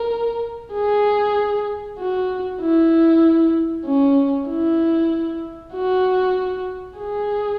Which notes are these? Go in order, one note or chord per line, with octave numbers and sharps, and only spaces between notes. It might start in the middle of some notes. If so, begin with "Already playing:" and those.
Already playing: A#4
G#4
F#4
E4
C#4
E4
F#4
G#4